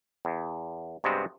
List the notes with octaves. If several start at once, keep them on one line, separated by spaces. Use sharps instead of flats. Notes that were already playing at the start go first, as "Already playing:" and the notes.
E2
G2 C3 G#3 B3 C4 F#4